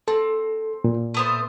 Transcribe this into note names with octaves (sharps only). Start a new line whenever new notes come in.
C4 A4
A#2
A3 B3 C5